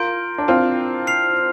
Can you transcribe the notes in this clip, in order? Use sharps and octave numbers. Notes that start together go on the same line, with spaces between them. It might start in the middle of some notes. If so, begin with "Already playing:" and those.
Already playing: F4 A#4 C6 G6 D7
D4
C4 F4
F6 C7 F7